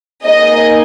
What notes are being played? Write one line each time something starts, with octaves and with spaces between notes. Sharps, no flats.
A#3 D#4 G#4 D#5